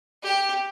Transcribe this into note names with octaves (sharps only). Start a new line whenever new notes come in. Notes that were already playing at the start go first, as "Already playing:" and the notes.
G4